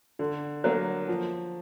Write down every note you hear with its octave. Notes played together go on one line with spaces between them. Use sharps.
D3
F#3 A#3
F3